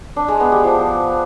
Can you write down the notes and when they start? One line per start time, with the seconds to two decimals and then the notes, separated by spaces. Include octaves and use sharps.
0.16 D4
0.28 G#3
0.40 B3
0.52 G4
0.64 F3